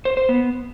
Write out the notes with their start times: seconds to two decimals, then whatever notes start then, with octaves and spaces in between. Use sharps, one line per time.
0.05 C5
0.17 C5
0.29 B3